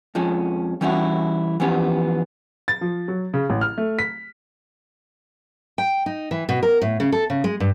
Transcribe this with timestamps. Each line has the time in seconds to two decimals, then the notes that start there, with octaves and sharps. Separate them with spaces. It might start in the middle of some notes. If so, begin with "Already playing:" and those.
0.15 F2 F3 G#3 C#4
0.81 E3 G3 C#4 D#4 E4 F#4
1.60 E3 F3 B3 C#4 G4
2.68 A6
2.81 F3
3.08 F#3
3.34 C#3
3.50 A1
3.61 F6
3.78 A3
3.99 B6
5.78 G5
6.06 D#4
6.31 E3
6.49 B2
6.63 A#4
6.82 A2
7.00 C#3
7.12 A4
7.30 C#3
7.44 G#3
7.60 G2